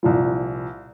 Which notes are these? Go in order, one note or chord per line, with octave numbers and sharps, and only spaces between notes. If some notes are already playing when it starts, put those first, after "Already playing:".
C2 A#2 F3